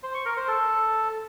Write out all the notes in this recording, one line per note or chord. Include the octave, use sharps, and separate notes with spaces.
C5
C#6
A#4
C5
A4